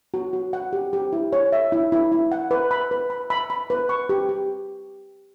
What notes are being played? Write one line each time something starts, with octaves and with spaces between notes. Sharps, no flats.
F#4
F#4
F#5
G4
G4
E4
C#5
E5
E4
E4
E4
F#5
B4
B5
B4
B5
B5
B5
B4
C#6
G4
G4